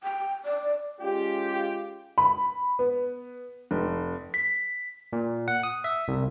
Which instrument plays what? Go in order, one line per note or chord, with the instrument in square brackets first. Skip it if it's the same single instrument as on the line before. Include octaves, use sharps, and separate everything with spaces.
[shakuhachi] G5
D5
[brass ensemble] G#3 C#4 F4 G4
[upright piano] B5
B3
F1
[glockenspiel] B6
[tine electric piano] A#2
F#5
D#6
E5
C2